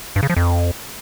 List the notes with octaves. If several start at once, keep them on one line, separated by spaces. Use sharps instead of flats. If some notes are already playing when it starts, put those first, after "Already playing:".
G2
C#3
F3
F2